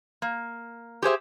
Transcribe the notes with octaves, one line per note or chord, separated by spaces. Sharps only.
A#3
G4 G#4 C5 E5